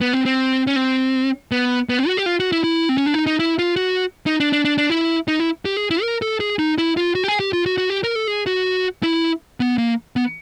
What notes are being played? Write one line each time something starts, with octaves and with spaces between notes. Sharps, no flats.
B3
C4
C4
C#4
C4
B3
B3
C4
F#4
G4
F4
F#4
E4
E4
C4
C#4
D4
D#4
D#4
E4
F4
F#4
D#4
D4
D4
D4
D4
E4
D#4
E4
G4
G#4
E4
A#4
A4
G#4
D#4
E4
F4
F#4
G4
G#4
G4
F4
F#4
F#4
G4
A#4
A4
G#4
F#4
E4
B3
A#3
B3